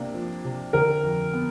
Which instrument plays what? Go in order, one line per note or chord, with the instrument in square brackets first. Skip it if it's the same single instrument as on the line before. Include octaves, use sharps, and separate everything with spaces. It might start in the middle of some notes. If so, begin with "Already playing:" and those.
Already playing: [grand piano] C3 A#3 D4
F3
C3
[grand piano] D3 [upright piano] A#4
[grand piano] F2
B3